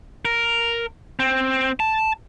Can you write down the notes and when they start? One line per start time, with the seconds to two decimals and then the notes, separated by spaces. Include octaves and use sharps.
0.25 A#4
1.19 C4
1.80 A5